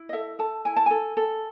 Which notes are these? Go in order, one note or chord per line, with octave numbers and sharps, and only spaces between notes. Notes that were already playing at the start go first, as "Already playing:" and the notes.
Already playing: E4
D#5
A4 E5
A4 A5
E4 G#5
A5
A4 G#5
A4